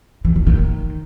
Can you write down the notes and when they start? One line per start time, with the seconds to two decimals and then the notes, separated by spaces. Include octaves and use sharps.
0.25 E3
0.36 D#3
0.47 D#3